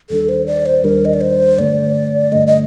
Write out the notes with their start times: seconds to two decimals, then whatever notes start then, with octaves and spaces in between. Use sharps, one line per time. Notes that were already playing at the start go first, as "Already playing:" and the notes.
0.10 D#2 D#3 G3 D4 A4
0.29 C5
0.47 D5
0.66 C5
0.84 D#2 D#3 G3 D4 A#4
1.05 D#5
1.13 D5
1.21 C5
1.58 G2 D3 A3 D5
2.32 G2 D3 A3 D#5
2.47 D#5